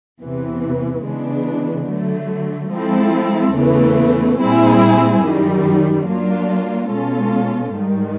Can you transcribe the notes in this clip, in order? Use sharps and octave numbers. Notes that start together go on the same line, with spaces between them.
E2 C3 E3
C#3 E3 G#3 B3 D4
D3 F#3 A3
F3 G#3 C4 E4 A4
E2 C#3 E3 A3
A#2 G3 C4 E4 G#4
F#2 D#3 G3
F#3 A#3 D4 F4
B2 G#3 C#4 F4 A4
G#2 D#3 G3